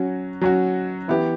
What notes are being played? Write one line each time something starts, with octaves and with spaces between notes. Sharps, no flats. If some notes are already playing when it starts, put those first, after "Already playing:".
Already playing: F#3 C#4 F#4
F#3 C#4 F#4
E3 B3 E4 G4